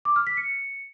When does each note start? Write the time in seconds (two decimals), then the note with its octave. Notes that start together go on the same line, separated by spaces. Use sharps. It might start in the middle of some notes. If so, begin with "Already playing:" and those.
0.05 D6
0.16 F6
0.27 B6
0.37 C#7